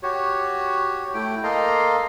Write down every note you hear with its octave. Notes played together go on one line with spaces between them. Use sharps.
F#4 G4 C#5
A3 E4 G5
A#3 A4 D#5 F5 A#5 C6